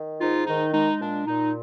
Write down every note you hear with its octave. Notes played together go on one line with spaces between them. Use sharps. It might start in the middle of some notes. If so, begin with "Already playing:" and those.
Already playing: D#3
G#2 D#4 F4
D#3 D#4
G#3 D#4
A#2 D4
A#2 D#4